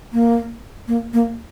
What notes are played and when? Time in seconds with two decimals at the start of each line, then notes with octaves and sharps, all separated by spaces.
0.13 A#3
0.88 A#3
1.13 A#3